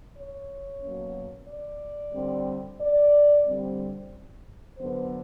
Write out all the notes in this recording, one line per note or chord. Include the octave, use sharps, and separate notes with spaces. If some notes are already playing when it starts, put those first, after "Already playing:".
C#5
B2 F#3 A#3 C#4
D5
D3 G3 C4
D5
D3 G3 C4
D3 F#3 B3 C5